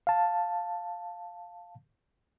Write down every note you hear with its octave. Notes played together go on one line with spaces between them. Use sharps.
F5 A5